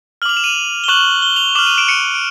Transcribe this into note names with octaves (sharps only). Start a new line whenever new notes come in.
D6 F6 F7 F#7
E7
D#7 F7
G7
C#6 F#6 E7 F#7
G7
F7 G7
D6 F6 E7 F#7
D#7 F7
D7 E7
C#7 D#7
D7